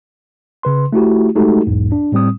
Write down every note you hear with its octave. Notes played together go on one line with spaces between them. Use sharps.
C#3 B4 C6
A3 E4 F#4 G4
G#3 A3 D#4 F#4 G4 A4
B1 E2 G#2
D4
A2 G3 C4 D#6